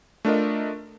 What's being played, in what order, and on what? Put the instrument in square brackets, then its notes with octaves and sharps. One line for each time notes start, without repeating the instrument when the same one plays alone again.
[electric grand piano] A3 D4 F4 A#4 D#5